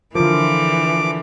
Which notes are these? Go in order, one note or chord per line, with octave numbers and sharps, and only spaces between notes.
D3 E3 F3 F4 A#4 D6